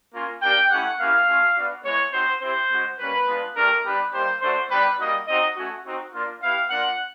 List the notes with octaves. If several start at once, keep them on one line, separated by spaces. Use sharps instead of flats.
A#3 C#4 F4
A#3 D4 G4 G5
A3 C#4 E4 G4 F#5
A#3 C#4 E4 G4 F5
A3 C#4 F4
B3 D4 F#4
G#3 B3 E4 C#5
C4 D#4 F#4 C5
C4 E4 G4 C5
G#3 C#4 F#4
G3 A#3 C#4 B4
G#3 B3 D4 F4
A3 D4 G4 A#4
G3 B3 D4 G4 B4
G3 A#3 D#4 G4 C5
A3 D4 F#4 C5
G3 B3 D4 G4 B4
G3 A#3 D#4 F#4 D#5
C4 D#4 F#4 D#5
A3 C#4 F#4
C4 D#4 F#4
A#3 D4 F4
B3 E4 G4 F5
A#3 D4 F4 F#5